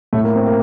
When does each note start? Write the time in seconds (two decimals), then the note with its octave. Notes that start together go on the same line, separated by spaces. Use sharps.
0.13 A2 A3
0.24 A#3
0.35 C4
0.47 A#3